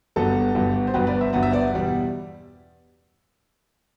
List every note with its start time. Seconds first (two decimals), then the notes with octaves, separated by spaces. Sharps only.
0.16 G1 G2 F#3 B3 F#4 A4
0.55 G1 G2 F#3 B3
0.87 C5
0.94 G1 G2 F#3 B3 G4 B4
1.07 B4 D5
1.21 C5 E5
1.33 G1 G2 F#3 B3 F#5
1.43 E5
1.52 D5 F#5
1.72 E2 B2 G3